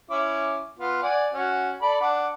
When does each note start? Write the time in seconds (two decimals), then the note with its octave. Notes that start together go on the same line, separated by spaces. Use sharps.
0.10 C#4 E4 D6
0.79 B3 F4
1.02 D5 F#5 G#5
1.33 C#4 F#4
1.82 A4 D5 B5
2.01 D4 F#5 D6